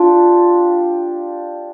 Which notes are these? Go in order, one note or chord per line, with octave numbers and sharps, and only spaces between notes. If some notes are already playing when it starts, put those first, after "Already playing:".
Already playing: D4 F4 G4